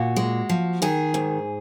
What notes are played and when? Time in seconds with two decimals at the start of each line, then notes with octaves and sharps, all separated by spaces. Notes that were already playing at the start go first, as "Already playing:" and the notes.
Already playing: A#2 F#4
0.16 G#3
0.49 F3
0.82 D#3 G#4
1.14 G#2